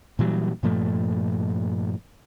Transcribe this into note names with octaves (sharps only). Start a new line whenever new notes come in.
A#2 E3 F#3 G3
G2 A#2 F3 A3